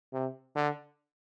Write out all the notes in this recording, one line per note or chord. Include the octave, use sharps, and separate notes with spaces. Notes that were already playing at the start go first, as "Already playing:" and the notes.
C3
D3